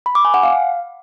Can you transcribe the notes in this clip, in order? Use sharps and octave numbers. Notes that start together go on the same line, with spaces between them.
B5
D6
G#5
F#5
F5